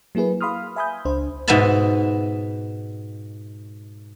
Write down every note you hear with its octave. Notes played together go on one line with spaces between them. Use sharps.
F#3 A#3 E4 G#4 B4
F5 B5 C6 D#6 F6
E5 G#5 B5 D#6 G6
C#2 D4 C5
G#2 B2 D#5 E5 A5 B5